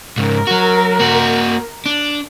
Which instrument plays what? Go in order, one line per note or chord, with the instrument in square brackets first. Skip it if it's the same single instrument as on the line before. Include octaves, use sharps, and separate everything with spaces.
[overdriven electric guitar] G#2 C#3 [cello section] A#4
[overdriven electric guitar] F#3 F#4
A#3 F#4
D4